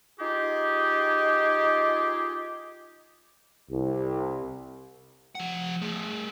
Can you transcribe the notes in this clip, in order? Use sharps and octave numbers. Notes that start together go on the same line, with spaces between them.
D#4 F4 G4 G#4
C2
F3 F#5
A3 G#4